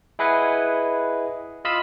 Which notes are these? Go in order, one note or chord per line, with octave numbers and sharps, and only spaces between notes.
E4 G#4 B4 D#5 F#5 G#5
F4 D#5 F5 B5 E6